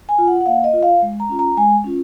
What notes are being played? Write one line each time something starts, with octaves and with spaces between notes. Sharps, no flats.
G#5
F4
F#5
F#5
A#3 F5
D#5
F4
F5
G#3
A#5
C#4 F4
A#5
G#3 G#5
C#4 F4